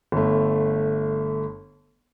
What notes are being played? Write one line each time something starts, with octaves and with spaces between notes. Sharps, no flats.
G1 A3